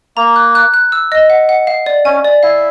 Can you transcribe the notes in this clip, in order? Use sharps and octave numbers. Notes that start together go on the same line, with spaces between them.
A#3 A#5
F#6
F#6
F#6
E6
D#5
F#5
F#5
F5
D5
C#4 G#5
D5
E4 F5